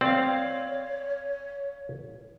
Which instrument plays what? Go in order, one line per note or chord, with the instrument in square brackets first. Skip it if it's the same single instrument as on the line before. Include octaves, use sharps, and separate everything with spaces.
[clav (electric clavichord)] C4 [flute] C#5 [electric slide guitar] D5 F5